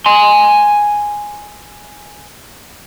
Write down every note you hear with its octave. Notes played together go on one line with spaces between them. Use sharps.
G#5 C6